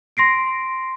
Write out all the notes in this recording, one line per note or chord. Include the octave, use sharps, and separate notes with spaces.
C6 A#6 C7 D7